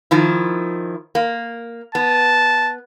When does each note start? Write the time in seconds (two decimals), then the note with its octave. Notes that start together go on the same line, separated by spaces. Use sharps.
0.11 D#3 F3 E4
1.15 A#3
1.95 B3 A5